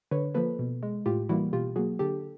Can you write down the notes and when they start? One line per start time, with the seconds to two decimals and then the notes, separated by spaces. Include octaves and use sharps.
0.11 D3 B4 C#5
0.35 F3 A#3 A4 B4
0.59 B2
0.83 G#3
1.06 A2 F4 G4
1.29 E3 G3 A#3 E4 F#4
1.53 B2 F4 G4
1.76 F#3 F#4 G#4
1.79 A#3
1.99 D3 G4 A4